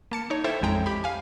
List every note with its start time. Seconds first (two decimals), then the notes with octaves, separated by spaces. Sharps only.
0.11 A#3 A5 C#7
0.30 D#4 C#5
0.44 E4 A4 C5 E5 G5
0.62 A1 F2 G#3 G5 A#5
0.86 G4 B5
1.04 F5 G#5